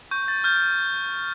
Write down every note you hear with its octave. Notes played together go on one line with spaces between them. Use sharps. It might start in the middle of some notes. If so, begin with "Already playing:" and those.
C#6 G6
A6
F6 G6